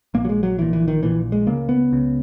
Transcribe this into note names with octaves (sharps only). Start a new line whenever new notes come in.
A#1 A#2 A#3
F#3
G#3
F#3
A#1 A#2 E3
E3
D#3
A#1 A#2 E3
G#3
C#2 C#3 A#3
B3
C#2 C#3